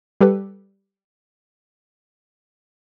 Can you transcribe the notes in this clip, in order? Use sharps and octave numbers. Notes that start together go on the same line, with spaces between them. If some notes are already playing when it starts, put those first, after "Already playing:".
G3 G4 A4 B4